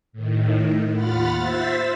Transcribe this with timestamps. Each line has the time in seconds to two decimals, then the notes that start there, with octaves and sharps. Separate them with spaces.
0.13 A2 D#3
0.91 D#2 F4 F#5 B5 F6 A6
1.36 C5 E5 A6 B6